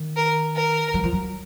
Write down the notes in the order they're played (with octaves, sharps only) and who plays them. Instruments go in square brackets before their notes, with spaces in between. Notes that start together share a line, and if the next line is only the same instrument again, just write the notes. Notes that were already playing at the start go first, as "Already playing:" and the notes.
Already playing: [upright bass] D#3
[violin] A#4
A#4
[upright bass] F#3
F3
F#3